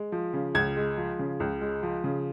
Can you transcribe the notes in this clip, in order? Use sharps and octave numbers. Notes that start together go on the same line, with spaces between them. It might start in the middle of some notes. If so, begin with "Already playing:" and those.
Already playing: G#3
F3
C#3
C#2 G#6
G#3
F3
C#3
C#2
G#3
F3
C#3